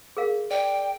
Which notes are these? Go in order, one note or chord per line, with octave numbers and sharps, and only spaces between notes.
G#4 A#4 F5
D5 G5